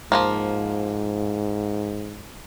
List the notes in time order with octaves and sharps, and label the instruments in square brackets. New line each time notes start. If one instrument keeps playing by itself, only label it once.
[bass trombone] G#2 [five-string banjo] F3 F#3 A#3